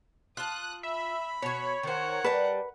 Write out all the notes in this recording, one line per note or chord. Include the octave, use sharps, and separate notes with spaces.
F4 A5 D#6 F#6
E5 B5
B2 F#4 C#5
D#3 A#4 C5 F#5
G3 B4 D5 A5